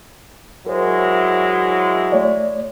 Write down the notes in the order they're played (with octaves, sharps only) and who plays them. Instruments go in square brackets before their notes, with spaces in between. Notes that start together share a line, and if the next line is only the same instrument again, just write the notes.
[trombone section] F#3 G#3 E4 [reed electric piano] A#4 C5
[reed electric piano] A3 C#5 D5